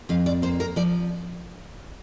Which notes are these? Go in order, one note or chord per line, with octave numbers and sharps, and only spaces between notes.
F2 F5
D5
A#3 C5
A#4
F3 D5